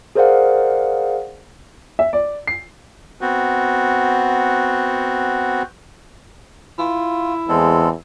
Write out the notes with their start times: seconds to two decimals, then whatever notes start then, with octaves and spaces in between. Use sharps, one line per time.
0.15 G#4 A#4 C5 D5 F5 F#5
1.99 E5
2.13 D5
2.47 C7
3.21 B3 C4 F#4
6.79 E4 F4
7.48 E2 G#3 C4 A4